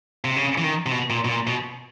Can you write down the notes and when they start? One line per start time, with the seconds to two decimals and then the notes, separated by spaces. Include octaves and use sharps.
0.25 C3
0.36 C#3
0.58 E3
0.64 D#3
0.86 C3
0.91 B2
1.10 A#2
1.25 B2
1.29 A#2
1.47 B2